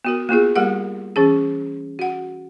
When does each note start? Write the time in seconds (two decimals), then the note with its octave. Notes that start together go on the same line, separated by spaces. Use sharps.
0.05 B3 F#4 A#4
0.29 A#3 B3 F4 G#4
0.56 G3 A#3 G4 A#4 F#5
1.16 E3 C#4 G#4
1.99 F#4 F#5